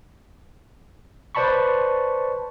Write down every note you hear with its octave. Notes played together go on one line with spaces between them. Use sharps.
B4 C5 D5 A5 B5 C#6